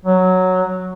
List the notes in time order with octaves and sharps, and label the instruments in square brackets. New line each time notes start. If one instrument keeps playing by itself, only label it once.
[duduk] F#3